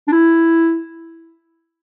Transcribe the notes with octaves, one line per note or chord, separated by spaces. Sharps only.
D4
E4